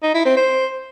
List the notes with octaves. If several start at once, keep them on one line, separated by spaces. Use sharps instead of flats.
D#4
E4
C4
C5